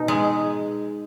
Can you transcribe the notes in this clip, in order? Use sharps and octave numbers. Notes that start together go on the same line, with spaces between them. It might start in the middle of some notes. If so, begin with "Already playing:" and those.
Already playing: B2 D#4
G#3